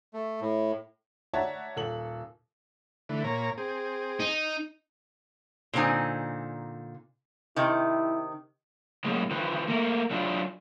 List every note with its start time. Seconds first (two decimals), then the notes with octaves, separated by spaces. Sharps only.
0.14 A3
0.41 A2
1.33 F#4 C#5 D5 E5 A5 A#5
1.76 D#1 A4 F#7
3.09 D3 E3 A3
3.24 A#2 C#5 A#5
3.57 C4 G#4
4.20 D#4
5.73 A#2 D3 C4 D#4 G#5
7.56 C3 D#3 E4
9.04 A2 F#3 G#3 A#3 C#4
9.30 D#3 F3 B4
9.68 A3 A#3 A#4
10.11 F#3 D4 F4